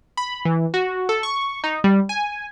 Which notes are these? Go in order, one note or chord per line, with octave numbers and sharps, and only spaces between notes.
B5
E3
F#4
A4
C#6
D#4
G3
G#5